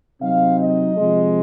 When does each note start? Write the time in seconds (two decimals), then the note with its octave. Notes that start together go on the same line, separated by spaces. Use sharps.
0.21 C3 F#3 C4 D#4 F5
0.59 D#5
0.96 C3 F3 G#3